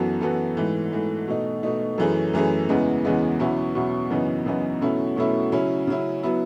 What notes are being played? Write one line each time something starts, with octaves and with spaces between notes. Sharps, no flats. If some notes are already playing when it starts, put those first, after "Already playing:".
Already playing: F#2 E3 B3 F#4 A4
F#2 E3 B3 F#4 A4
G#2 E3 A3
G#2 E3 A3
B2 A3 D#4
B2 A3 D#4
F#2 E3 A3 C#4 G#4
F#2 E3 A3 C#4 G#4
E2 C#3 E3 G#3 B3
E2 C#3 E3 G#3 B3
E2 B2 F#3 C#4 E4
E2 B2 F#3 C#4 E4
F#2 C#3 E3 B3 D#4
F#2 C#3 E3 B3 D#4
B2 F#3 A3 C#4 E4
B2 F#3 A3 C#4 E4
C#3 F#3 C#4 E4
C#3 F#3 C#4 E4
F#3 B3 E4